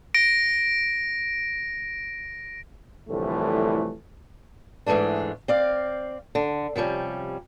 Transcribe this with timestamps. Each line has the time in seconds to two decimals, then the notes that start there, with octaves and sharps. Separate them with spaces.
0.14 A#6 D7
3.09 C2 A2 D3 E3 F3 A3
4.86 G#2 E3 G#3 A3 D4
5.48 C4 D5 F5
6.35 D3
6.76 C3 F3 G3 C#4